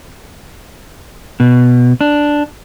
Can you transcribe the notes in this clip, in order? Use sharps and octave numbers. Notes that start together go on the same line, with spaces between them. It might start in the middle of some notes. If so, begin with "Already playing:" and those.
B2
D4